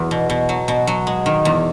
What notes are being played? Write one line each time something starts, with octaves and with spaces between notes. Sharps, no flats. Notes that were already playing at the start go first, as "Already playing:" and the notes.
Already playing: E2 F#3 B3
B2
B2
F#3
B2
F#3
G#3
D#3
E2